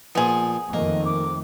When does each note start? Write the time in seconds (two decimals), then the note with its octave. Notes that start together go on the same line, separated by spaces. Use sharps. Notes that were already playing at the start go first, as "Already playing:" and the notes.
0.15 A#2 F3 B3 G#4
0.73 F2 D#3 A3 A#3 D#5
1.05 D6